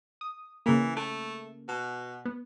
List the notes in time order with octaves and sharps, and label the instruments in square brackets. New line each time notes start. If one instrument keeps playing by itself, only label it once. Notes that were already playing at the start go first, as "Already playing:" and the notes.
[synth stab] D#6
[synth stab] C#3 A#3 [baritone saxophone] E3
[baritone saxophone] A3
B2
[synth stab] B3